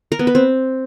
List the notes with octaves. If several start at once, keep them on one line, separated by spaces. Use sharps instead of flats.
A#4
B3
B4
C4